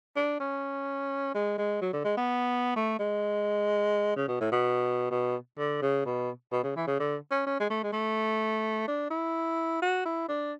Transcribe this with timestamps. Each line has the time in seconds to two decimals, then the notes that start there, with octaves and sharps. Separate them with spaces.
0.16 D4
0.40 C#4
1.35 G#3
1.58 G#3
1.82 F#3
1.93 D3
2.04 G#3
2.17 B3
2.76 A3
2.99 G#3
4.16 C#3
4.28 B2
4.41 A2
4.52 B2
5.11 B2
5.59 D3
5.82 C#3
6.06 B2
6.52 B2
6.63 C#3
6.76 E3
6.87 C#3
7.00 D3
7.31 C#4
7.46 C#4
7.60 G#3
7.70 A3
7.84 G#3
7.93 A3
8.88 D4
9.11 E4
9.82 F#4
10.06 E4
10.28 D4